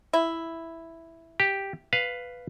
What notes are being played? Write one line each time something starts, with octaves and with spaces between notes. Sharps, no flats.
E4
G4
B4 F5